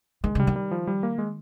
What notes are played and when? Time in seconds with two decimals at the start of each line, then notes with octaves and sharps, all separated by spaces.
0.24 D#3 G#3
0.35 C#3 G3
0.47 D#3
0.56 G3
0.71 F3
0.87 G3
1.03 A#3
1.18 G#3